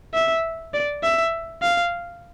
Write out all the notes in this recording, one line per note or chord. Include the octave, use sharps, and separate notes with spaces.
E5
D5
E5
F5